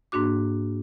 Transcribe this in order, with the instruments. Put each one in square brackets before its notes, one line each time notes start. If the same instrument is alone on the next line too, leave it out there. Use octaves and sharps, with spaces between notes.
[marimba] G#2 A#3 D4 F#4 D6